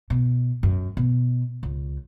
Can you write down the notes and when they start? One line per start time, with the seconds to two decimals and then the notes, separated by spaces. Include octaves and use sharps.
0.10 B2
0.63 F#2
0.97 B2
1.63 C#2